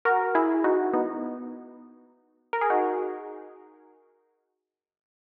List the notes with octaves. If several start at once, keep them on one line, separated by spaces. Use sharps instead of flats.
F#4 A#4
E4 G#4
D#4 F#4
B3 D#4
A#4
G#4
D#4 F#4